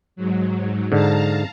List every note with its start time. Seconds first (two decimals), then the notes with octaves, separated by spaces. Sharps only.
0.16 G#2 F#3
0.92 G#2 D3 F5 A5 A#5